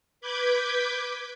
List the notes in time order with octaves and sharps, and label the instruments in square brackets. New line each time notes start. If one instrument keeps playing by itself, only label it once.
[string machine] B4 B5 D6 G6 G#6